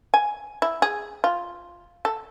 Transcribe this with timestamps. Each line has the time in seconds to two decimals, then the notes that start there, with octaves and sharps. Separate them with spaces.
0.14 G#5
0.62 E4
0.82 G#4
1.24 F4
2.05 A4